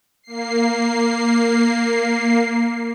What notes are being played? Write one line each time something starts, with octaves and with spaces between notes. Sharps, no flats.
A#3 C7